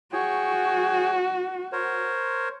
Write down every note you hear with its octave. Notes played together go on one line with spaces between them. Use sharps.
F#4 G#4 C#5 G5
A#4 C5 C#5